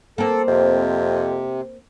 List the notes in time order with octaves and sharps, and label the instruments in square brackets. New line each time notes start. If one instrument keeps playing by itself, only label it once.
[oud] A#3 C4 [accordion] A4
[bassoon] F2 [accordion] C3